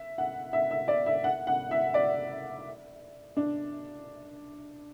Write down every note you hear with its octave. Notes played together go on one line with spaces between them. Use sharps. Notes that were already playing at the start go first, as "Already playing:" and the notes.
Already playing: E5
F#5
E5
E5
D5
E5
F#5
F#5
E5
D5
D4